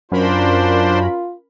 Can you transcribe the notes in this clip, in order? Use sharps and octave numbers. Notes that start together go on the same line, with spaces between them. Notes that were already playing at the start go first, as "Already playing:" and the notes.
F#2 C#4 D4 F4 A#4 C5 B5